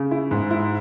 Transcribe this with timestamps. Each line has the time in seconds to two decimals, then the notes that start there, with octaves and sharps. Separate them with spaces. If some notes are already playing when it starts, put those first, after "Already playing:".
Already playing: C#3
0.11 E4
0.31 G#2
0.51 E4